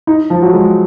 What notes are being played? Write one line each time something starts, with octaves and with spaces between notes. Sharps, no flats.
D#4
F3
F#3
G#3